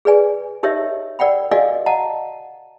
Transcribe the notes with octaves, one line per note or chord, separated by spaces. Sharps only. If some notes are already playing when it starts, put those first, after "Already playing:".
G#4 B4 D5 G#5
D#4 G4 A#4 C#5 D#5 E5
A#4 D5 F#5 G5 B5
F#4 A#4 D5 D#5 F5 G#5
D#5 F#5 A5 A#5